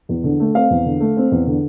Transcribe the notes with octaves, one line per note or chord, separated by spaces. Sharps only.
E2
D3
A3
C4 F5
E2
D3
A3
C4
E2
D3